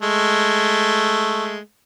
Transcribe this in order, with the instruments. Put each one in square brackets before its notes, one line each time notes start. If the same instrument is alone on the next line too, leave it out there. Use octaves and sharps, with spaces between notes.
[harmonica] G#3 A3